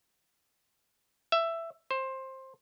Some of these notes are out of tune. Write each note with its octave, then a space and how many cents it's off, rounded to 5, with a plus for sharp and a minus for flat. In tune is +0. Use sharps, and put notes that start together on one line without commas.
E5 +10
C5 +15